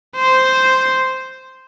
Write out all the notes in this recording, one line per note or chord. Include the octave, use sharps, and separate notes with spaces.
C5